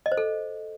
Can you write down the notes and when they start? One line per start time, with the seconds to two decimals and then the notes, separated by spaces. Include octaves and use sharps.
0.06 D#5
0.12 C5
0.17 A4